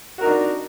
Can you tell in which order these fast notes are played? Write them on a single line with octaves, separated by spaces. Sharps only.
F#4 A#4 D#4 D4